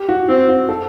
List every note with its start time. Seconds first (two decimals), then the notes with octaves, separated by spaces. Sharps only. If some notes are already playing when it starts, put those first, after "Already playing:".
Already playing: G4
0.09 F#4
0.28 C4 F#4
0.49 F#4
0.69 A4